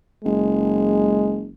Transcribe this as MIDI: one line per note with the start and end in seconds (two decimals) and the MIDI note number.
0.25 1.54 30
0.25 1.48 56